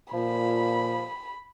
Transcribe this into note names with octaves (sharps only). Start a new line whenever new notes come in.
A#2 F3 B5